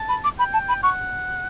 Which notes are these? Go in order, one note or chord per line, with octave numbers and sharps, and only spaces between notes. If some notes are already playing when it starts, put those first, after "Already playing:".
Already playing: A5
B5
D6
G5 B5
A5
B5
F#5 C#6